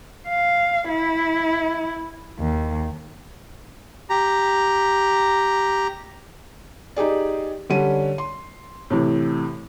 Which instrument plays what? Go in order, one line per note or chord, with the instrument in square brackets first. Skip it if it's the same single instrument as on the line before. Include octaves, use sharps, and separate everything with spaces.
[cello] F5
E4
D#2
[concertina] G4 A#5
[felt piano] D#4 G4 G#4 D5
D3 G3 C#4 D#7
C6
A2 C3 E3